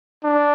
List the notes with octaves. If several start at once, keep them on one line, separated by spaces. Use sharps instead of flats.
D4